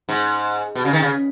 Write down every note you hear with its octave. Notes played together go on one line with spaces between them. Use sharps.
G#2
B2
C#3
D#3
C#3